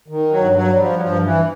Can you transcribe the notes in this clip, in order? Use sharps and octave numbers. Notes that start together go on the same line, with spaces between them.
D#3
F#3
G2
F#3
G3
F3
F#3
G2 F3
E3